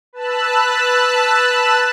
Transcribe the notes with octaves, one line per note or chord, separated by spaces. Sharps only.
B4 A5 E6 F#6